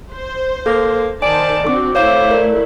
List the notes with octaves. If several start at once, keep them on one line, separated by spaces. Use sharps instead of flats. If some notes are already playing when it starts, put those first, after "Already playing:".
C5
A#3 A4
D#3 C5 D5 G#5 A5
C4 D4 F#4 D6
A3 E4 C5 C#5 F5 D6
A#4 D5